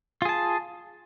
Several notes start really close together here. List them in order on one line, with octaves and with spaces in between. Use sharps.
F4 G#4 A5